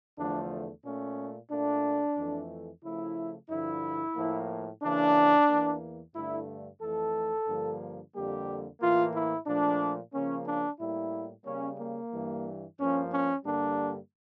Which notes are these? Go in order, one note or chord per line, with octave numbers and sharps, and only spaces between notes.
E2 D3 F3 A3 D4
A#2 A3 C#4
A#2 A3 D4
F2 E3 A3
C#3 F3 A3 E4
G2 D3 F3 E4
A2 F3 A#3
C#3 E3 A#3 D4
E2 E3 A#3
G2 D3 A3 E4
F2 E3 A3 A4
G2 D3 F3 A#3
F2 D3 G3 A#3 G4
A2 E3 A#3 F4
E4
A#2 F3 A3 D4
C#3 F3 A#3 C#4
D4
A2 G3 A#3 E4
C#3 G3 A#3 C#4
A#3
G2 E3 G3
G2 F3 A#3 C#4
C#4
G2 D3 G3 A#3 D4